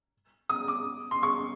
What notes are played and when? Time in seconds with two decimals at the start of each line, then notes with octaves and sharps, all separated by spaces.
0.49 D#6
0.68 D6
1.11 C6
1.23 C#6